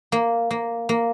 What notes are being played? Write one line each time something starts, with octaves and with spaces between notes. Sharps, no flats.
A#3
A#3
A#3